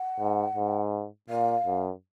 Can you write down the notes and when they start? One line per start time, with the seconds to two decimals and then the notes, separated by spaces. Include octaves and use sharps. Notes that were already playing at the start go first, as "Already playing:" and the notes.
Already playing: F#5
0.19 G#2
0.56 G#2
1.29 A#2 F5
1.66 F#2